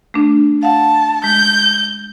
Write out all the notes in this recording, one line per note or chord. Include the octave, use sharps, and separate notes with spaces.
A3 D4
F5 F#5 A5
G#3 G6